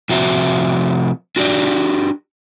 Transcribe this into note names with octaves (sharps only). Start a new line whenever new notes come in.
C3 F3 F#4 C5 E5
D4 F#4 G4 D5